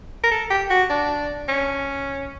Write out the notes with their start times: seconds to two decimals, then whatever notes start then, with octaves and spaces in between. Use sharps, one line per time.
0.24 A#4
0.32 A4
0.50 G4
0.70 F#4
0.90 D4
1.48 C#4